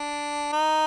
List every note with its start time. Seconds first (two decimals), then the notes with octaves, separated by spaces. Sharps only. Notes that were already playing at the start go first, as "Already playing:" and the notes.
Already playing: D4
0.53 D#4